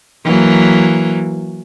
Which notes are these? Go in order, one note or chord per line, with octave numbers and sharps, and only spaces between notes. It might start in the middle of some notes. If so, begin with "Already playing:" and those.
E3 F#3 A#3